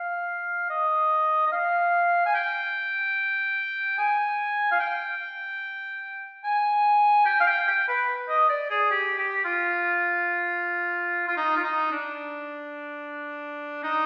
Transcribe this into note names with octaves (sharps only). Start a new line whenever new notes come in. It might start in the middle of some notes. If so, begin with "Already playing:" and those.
Already playing: F5
D#5
D#5
F5
G#5
G5
G#5
F5
G5
G#5
G5
F5
G5
G5
B4
D#5
D5
G#4
G4
G4
F4
F4
D#4
F4
D#4
D4
D#4